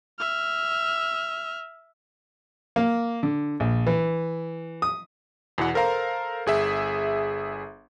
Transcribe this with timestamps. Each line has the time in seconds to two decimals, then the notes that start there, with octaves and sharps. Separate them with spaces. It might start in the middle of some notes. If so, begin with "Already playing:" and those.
0.19 E5 F6
2.76 A#3
3.23 D3
3.60 A#1
3.87 E3
4.82 D#6
5.58 E2 B2 E3 F#5
5.74 A4 A#4 C5 F5 A#5
6.46 G1 G#4 E5